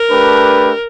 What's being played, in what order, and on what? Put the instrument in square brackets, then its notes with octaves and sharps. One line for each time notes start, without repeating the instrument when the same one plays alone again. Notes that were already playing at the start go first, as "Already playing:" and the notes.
Already playing: [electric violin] A#4
[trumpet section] A3 D4 G4 B4